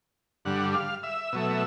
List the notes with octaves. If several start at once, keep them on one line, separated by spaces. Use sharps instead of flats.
G2 D3 G3 F#5
F5
E5
B2 F#3 A3